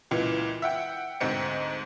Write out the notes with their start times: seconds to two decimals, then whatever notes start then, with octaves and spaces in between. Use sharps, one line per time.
0.11 C#2 A#2 E3
0.62 E5 F#5 G5
1.20 D2 G#2 C4 C#7